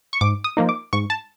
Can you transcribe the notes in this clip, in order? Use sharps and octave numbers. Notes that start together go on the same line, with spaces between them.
C#6
G#2 D6
D#6
F3 A#3 D#4
D6
G#2 C#6
A5